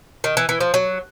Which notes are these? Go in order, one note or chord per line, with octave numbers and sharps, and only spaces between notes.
D#3
E3
E3
F3
F#3